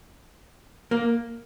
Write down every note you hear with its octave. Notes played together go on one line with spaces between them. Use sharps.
A#3